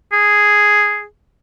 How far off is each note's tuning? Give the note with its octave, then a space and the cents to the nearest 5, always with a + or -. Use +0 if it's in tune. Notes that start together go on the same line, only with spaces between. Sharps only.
G#4 +0